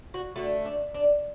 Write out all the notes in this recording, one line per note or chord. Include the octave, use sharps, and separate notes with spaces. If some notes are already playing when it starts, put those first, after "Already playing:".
F#4
D3 A3 F#4
D4
D4